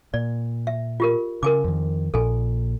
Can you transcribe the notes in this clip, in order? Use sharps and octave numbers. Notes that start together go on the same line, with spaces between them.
A#2 D5
E5
F4 G4 A#4
C#3 A#4 G#5 D6
F2 D#3
A#1 A#2 A4 G#5